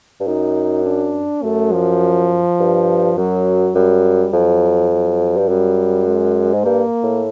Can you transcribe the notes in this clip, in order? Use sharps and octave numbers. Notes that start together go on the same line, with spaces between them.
G2
F#2 D#4
D4
F#2 A3
F3
G2
F#2 F#3
F#2 G3
F2 F#3
F#3
G2
F#2 G3
G#3
G#2
G2 A#3
A2